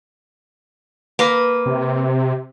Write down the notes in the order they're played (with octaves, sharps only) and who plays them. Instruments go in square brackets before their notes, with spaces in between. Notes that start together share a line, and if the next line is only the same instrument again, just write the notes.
[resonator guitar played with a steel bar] A#3 B4
[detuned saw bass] C3